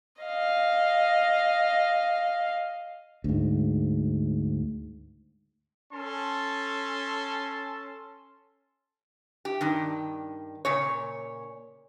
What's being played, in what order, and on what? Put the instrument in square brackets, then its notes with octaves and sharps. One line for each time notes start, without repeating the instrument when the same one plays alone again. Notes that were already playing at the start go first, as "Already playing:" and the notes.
[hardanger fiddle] D#5 F5
[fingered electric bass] D2 G#2
[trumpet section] C#4 A4 A5 C6
[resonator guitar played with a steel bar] G4
G2 D#3
A#2 C#3 C#5